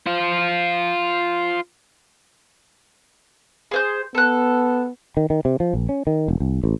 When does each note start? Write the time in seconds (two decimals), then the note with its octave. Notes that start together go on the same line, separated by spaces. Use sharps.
0.06 F4 C5
3.71 G#4 C5 G6
4.15 B3 A4 F#6
5.17 D#3
5.30 D#3
5.45 C3
5.60 F3
5.73 A#1
5.89 C#4
6.07 D#3
6.28 E1
6.40 C2
6.64 A1